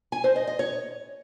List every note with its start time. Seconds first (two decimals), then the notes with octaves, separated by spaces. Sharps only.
0.12 G#5
0.24 C5
0.36 D#5
0.47 D#5
0.59 C#5